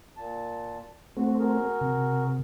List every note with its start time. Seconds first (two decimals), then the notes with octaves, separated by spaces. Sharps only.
0.17 A#2 A5
1.17 A3 C4 F#4
1.39 F#4 G#4 A#4
1.81 C3